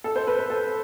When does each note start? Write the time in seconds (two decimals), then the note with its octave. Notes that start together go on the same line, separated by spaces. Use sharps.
0.04 A4
0.16 C5
0.27 B4
0.38 B4
0.50 A4